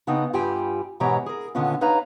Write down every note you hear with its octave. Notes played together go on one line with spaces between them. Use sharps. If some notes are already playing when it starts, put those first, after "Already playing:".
C#3 B3 C4 D4 D#4
G2 G3 F4 G4 G5 G#5
G#2 B2 E3 G4 C#5 A#5
G#4 A#4
A#2 D3 D#3 B3 C#4 F4
D#4 B4 C#5 F5 A#5